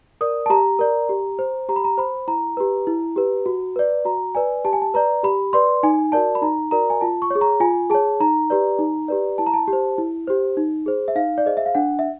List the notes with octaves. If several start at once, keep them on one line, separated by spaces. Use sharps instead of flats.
A#4 D5 D#6
A5
G4 A#5
A#4 D5
G4
C5
G4 A#5
B5
A#5
C5 B5
E4 A#5
G4 B4
E4
G4 B4
F#4
B4 D5
F#4 A#5
B4 D5 G#5
G4 A5
G#5
A5
B4 D5 A#5
G4 B5
B4 D5 C6
D#4 G#5
F#4 A#4 D5 A5
B5
D#4 A#5
F#4 A#4 D5 A#5
G#5
F4 A5
C#6
G#4 C#5
A#5
F4 G#5
G#4 C#5 A5
D#4 A#5
G4 B4 D5
D#4
G4 B4 D5
E4 A5
A#5
A5
G4
C5
E4
G4 C5
D#4
G#4 C5
E5
D#4 F5
D5
G#4 C5 D#5
E5
F5
D4 F#5
E5